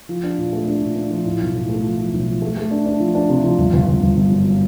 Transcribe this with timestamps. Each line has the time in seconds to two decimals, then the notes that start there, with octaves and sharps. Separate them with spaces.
0.09 F3
0.24 D4
0.38 A#2
0.53 A3
0.67 D4
0.82 A#2
0.96 D4
1.11 F3
1.25 A2
1.40 B1
1.54 A2
1.69 A3
1.84 F3
1.98 F3
2.13 B1
2.28 F3
2.42 A3
2.57 A3
2.71 D4
2.86 D4
3.00 F3
3.15 D4
3.30 C3
3.44 F3
3.58 G1
3.73 G1
3.88 G1
4.03 G1
4.17 G1
4.31 F#2